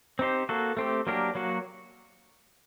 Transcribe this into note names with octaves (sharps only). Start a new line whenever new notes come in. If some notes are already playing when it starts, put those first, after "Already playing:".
C4 D#4 G4 C5
A#3 F#4 A4
A3 C4 G4
F#3 A#3 D4 G4 A#4
F#3 A#3 F#4